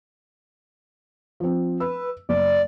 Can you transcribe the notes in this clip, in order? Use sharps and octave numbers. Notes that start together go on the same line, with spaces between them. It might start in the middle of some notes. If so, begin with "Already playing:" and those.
F3 C4
B4 E6
F#1 D5